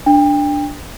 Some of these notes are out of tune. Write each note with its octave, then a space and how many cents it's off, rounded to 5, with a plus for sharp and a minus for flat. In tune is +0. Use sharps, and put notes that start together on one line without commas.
D4 +0 G5 +30